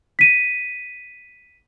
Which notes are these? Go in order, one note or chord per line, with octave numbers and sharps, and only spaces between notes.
B6 D#7